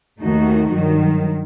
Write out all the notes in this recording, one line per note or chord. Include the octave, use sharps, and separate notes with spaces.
D#2 D#3 A3 D#4 F#4
G2 D#3 F#3